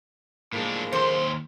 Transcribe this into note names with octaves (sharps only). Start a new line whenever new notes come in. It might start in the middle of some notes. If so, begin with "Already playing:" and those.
A2 F3 G#3 A#3 D4
D#2 C5 C6